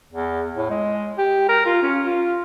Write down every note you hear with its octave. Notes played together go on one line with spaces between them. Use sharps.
E2
A2
G#3
G4
A#4
F4
C#4
F4